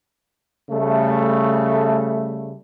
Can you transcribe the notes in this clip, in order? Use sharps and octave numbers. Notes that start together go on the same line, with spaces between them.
C#3 G3 A3